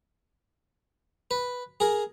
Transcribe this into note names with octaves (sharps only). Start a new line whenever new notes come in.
B4
G#4 A#4